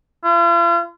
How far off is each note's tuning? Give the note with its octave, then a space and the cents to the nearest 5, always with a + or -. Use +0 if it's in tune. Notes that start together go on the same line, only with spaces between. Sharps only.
F4 -45